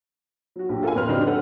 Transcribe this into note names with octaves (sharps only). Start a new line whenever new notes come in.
F#3 F#4
A#1 F#3 G4
F4 A4 A#4 F5 G#5
A1 F2 B4 C6 F6
D3 F#3 G3 C4 D4 D#4
A4 B4 F#5